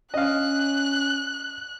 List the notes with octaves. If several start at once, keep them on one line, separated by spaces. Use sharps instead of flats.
C#4 D#5 F5 F#6